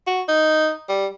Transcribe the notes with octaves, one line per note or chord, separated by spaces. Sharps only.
F#4
D#4
G3